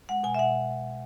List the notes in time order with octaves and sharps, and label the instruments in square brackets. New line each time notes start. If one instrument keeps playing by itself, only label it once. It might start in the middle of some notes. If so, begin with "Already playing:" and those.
[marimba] G#3 F#5
B2 G#5
E5
B2 F#5